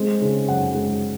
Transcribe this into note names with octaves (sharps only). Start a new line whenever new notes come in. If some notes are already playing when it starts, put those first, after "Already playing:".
Already playing: G#3 C4
C#3
F#2 F#5
G#3